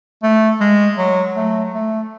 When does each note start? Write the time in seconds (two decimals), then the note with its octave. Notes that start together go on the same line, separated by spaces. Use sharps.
0.23 A3
0.60 G#3
0.98 F#3
1.36 A3
1.74 A3